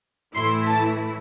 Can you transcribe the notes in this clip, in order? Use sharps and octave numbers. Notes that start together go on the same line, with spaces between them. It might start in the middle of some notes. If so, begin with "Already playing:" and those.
A2 E3 A3 E4 C6
A5